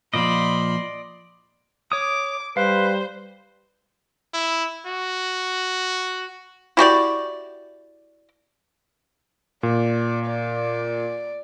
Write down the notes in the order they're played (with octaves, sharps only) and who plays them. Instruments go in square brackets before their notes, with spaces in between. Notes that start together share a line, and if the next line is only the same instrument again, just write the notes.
[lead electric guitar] A#2 F3 [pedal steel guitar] D5 D#5 [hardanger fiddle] B5 C6
[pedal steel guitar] C#5 D#6 [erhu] D6
[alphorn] G3 [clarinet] B4 [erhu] C5 [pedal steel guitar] F5
[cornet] E4
F#4
[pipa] E4 F#4 G4 D5
[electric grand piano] A#2 [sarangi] D5
[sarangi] D5